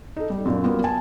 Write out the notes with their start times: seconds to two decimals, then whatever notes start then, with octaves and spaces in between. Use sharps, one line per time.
0.16 D#4 A4
0.30 G3
0.45 F#2 A#2
0.64 F#3 G3 A#3 B3 F4
0.84 G#5 A5